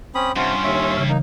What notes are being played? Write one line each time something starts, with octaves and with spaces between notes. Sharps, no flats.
C4 C#4 B5 D#6
G2 C3 C#4 F4 F#5
D#2 C#5 E5
C#3 E3
A#3 D#4